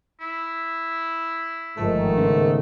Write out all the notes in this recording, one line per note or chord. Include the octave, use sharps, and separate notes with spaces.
E4
G1 G#2 D#3 F3 A3 A4
C#3 B3